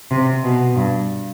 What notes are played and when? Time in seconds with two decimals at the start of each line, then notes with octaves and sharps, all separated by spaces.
0.11 C3
0.43 B2
0.76 G2